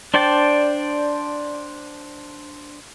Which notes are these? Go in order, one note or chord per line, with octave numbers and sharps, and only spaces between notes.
D4 C5 D5 G5 A5